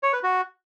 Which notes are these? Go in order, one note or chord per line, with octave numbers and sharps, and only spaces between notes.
C#5
B4
F#4